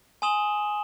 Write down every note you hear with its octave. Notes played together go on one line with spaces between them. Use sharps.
G#5 C6 D#6 E7 F#7 G7